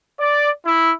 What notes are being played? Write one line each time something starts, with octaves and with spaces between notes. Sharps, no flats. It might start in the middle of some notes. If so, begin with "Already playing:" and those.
D5
E4